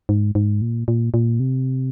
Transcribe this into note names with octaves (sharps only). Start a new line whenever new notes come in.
G#2
G#2
A#2
A#2
A#2
C3